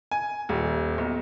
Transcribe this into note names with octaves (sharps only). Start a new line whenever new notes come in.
G#5
D#1
B1